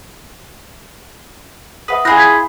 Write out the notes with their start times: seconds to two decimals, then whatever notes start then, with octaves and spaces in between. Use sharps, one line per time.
1.88 B4 E5 F#5 D#6
2.05 E4 F4 G#4 B5 F#6 G6 A#6
2.17 G#6 B6